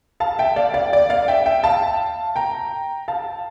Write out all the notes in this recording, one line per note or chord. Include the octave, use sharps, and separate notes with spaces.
F5 A5
E5 G5
D5 F5
D5 F5
D5
D5 F5
E5 G5
E5 G5
F5 A5
G5 A#5
F5 A5